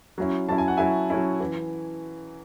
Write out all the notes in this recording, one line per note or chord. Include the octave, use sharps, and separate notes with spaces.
F#3 C#4 E4
F#3 C#4 E4 A5
G#5
F#5
F#3 C#4 E4 E5 G#5
F#3 C#4 E4
E3